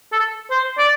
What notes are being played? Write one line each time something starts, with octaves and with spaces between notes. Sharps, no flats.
A4
C5
D5